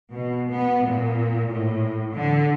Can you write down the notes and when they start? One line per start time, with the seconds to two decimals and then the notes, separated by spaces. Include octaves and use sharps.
0.12 B2
0.51 B3
0.86 A#2
1.51 A2
2.14 D3